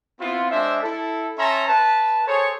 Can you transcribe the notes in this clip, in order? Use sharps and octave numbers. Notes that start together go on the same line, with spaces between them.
B3 C4 E4 F4
G#3 D4 C5 E5
E4 A4
C#4 E5 A5 A#5 C6
B4 A5
G#4 A4 C5 C#5